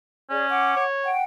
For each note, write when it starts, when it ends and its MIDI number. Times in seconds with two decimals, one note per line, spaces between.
0.30 0.76 61
0.30 0.46 68
0.30 0.46 74
0.50 0.84 78
0.50 0.84 86
0.76 1.11 73
1.04 1.23 78
1.04 1.23 79